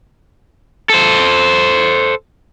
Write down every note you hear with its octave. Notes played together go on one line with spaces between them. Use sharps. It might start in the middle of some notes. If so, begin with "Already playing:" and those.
A4 C5